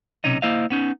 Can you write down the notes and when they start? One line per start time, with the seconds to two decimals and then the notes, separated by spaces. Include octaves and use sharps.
0.24 B1 C3 C#4 D#4 D#5
0.42 A#3 E4 C5 D#5 F5
0.70 B3 C#4 D#4